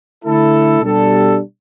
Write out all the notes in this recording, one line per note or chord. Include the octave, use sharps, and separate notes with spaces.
D3 A3 E4 A4
B2 G3 D4 A4